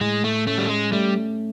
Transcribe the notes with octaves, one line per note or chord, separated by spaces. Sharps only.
A2 G#3
A3
A3 C#4
G3
G#3
G3 A3